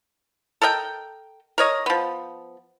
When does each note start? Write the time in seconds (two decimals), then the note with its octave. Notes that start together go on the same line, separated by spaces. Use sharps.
0.62 A4 A#4 D#5 G5
1.58 A#4 C#5 D#5
1.86 F3 B3